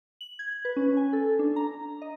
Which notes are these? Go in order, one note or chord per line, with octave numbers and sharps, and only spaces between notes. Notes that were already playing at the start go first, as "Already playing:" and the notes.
F#7
G#6
B4
C#4
G#5
A4
D4
A#5
D#5